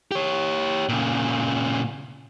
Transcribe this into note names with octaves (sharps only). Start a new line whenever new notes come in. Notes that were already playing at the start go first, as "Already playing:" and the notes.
G4 C#5
A#2 C#3